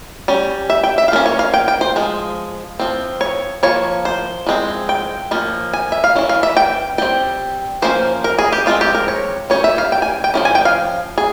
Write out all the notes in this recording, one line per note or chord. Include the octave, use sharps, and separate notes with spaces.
G3 C#4
E5
G5
E5
F5
F3 A#3 C#4
C#5
F5
G5
G5
C5
F3 G#3
F3 C4
C#5
F3 A#3 C#5
C5
F3 G#3 C4
G5
F3 A#3 C#4
G#5
E5
F5
E3 G#3 C#4
F5
E5
G5
G3 C4 G5
F3 A#3 C#4 C5
A#4
G#4
G4
F3 G#3 C4 F4
G4
A#4
C#5
G3 C#4 C#5
E5
F5
G5
G#5
G5
F3 A#3 C#4
G#5
G5
F5
G#4